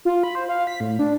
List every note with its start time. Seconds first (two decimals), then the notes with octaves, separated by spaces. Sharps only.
0.05 F4
0.23 B5
0.35 C5
0.49 F5
0.67 B6
0.80 A2
0.99 D4